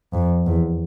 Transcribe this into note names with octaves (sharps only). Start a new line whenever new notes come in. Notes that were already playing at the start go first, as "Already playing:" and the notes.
F2
E2